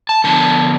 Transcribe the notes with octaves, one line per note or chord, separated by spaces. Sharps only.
A5
D3 F3 B3 D4 A5